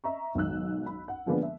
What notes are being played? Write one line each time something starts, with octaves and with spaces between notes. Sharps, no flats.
D#5 E5 A#5 C#6
B1 G#2 D#3 E6 F#6
B5
F#5
D3 F3 G#3 A#3 B3 D4
E5